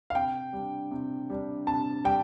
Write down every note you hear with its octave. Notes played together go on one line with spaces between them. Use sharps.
F5
C3 G5
G3 D4
C3
G3 D4
C3 A5
G3 G5